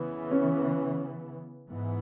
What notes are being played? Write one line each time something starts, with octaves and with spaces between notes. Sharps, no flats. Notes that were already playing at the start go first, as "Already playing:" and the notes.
Already playing: C#3 E3 B3
C#4
G#2 E3 B3